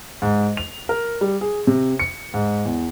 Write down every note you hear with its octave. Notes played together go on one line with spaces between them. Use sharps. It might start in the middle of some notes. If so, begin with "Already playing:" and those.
G#2
F7
A#4
G3
G#4
C3
C#7
G#2
E2